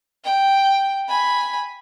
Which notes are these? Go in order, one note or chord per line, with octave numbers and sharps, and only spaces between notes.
G5
G#5 B5